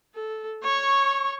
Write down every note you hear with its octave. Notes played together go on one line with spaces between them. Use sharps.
A4
C#5 C#6